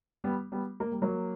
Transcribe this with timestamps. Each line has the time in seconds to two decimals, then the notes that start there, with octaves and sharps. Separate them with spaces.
0.24 G3 B3
0.52 G3 B3
0.80 A#3
0.92 G3
1.02 F#3 A#3